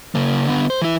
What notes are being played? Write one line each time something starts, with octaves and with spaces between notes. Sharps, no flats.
C#3 A#3
D3 B3
C5
E3 E4